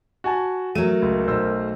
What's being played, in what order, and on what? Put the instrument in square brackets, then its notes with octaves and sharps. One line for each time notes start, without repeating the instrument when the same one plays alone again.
[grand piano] F#4 G#5 A5
[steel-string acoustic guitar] F#3 A3 [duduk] A#4 [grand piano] D#7
[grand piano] C#2
B1 C5 E6